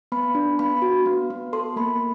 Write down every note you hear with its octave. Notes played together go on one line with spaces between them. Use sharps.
B3 B5
D4
B3 B5
F#4
B3
B3
A4 C6
A#3 B5